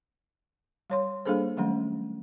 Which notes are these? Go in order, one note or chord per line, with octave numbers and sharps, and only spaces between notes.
G3 C#5 C6
G3 A#3 D4 G#4 A4 C5
D#3 F#3 G3 A3 C#4